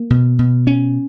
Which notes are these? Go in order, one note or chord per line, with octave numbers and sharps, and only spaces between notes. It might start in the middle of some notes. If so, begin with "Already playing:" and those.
Already playing: A#3
B2
B2
C#4